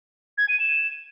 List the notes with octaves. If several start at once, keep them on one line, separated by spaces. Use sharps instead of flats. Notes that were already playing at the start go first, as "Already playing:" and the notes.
G#6
D#7
E7